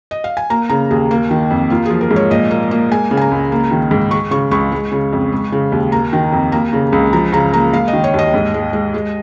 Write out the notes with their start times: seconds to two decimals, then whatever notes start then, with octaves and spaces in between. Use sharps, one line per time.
0.11 D#5
0.24 F5
0.37 G#5
0.50 A#3 A#5
0.69 C#3 A#5
0.91 D#2 G#4
1.11 A#3
1.31 D#3
1.50 F2
1.70 A#3 F4
1.86 F3 G#4
2.01 A#4
2.11 G#2
2.16 C#5
2.31 A#2 D#5
2.51 A#3
2.71 A#3
2.91 G#3 G#5
3.11 C#3
3.17 G#5
3.22 A#5
3.31 C#2
3.52 A#3
3.71 D#3
3.91 G#2
4.11 G#3 C#6
4.31 C#3 C#6
4.51 C#2 C#6
4.72 G#3
4.92 C#3
5.12 F2
5.32 G#3
5.52 C#3
5.72 D#2
5.92 A#3 A#5
6.13 D#3
6.32 F2
6.52 A#3 A#5
6.73 C#3
6.93 C#2
7.13 F3 A#5
7.32 C#3 A#5
7.54 A#3 A#5
7.73 G#3 F5
7.88 D#5
7.93 D#3
8.04 C#5
8.14 D#2 D#5
8.34 G#2
8.54 G#3
8.73 G#3
8.94 G#3